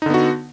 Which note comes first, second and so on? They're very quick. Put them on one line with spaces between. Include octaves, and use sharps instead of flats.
D#4 D3 B3 F#4